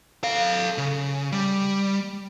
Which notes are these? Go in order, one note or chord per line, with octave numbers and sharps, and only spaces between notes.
A4 F5
C#3
G3